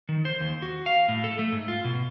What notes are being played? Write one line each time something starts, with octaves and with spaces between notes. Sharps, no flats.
D#3
C5
D#2
F#4
F5
A2
A4
A3
G#2
F4
B2